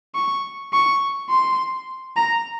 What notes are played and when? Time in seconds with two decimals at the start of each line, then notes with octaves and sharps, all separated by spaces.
0.15 C#6
0.73 C#6
1.30 C6
2.16 A#5